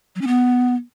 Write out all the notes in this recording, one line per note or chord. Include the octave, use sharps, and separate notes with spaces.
F#3
C#4
B3